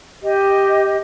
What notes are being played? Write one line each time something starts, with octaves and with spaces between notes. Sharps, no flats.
G4 D#5